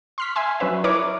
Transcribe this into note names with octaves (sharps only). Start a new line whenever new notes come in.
C6 F6 B6
E5 G#5 C6
F#3 C#4 B4 E5
E4 A#4 B4 C#5 D6